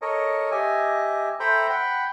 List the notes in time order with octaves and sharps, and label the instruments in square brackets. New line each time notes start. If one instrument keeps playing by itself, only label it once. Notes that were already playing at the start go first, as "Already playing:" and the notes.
[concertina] A4 A#4 C#5 D#5
G4 D#5 E5 G#5
A4 C5 E5 G5 A#5 B5
F#5 G5 B5